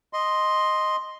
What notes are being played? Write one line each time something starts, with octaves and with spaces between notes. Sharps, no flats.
D#5 C6